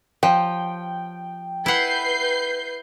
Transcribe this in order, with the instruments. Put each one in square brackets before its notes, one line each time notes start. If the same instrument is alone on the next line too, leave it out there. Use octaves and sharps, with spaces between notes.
[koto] F3 [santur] G5
[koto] E4 F#5 [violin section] B4 G6 C7